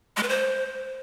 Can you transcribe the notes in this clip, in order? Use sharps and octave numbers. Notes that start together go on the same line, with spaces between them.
G#3
B4
C5